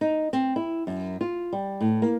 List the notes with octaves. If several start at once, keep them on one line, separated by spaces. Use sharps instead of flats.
D#4
C4
E4
F#2
F4
G3
A2
A#3